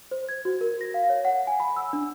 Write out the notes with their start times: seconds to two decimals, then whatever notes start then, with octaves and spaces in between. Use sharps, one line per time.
0.11 C5
0.29 G#6
0.45 F#4
0.61 A#4
0.81 A#6
0.94 F5
1.09 C#5
1.25 F#5
1.47 G#5
1.60 B5
1.77 E6
1.93 D4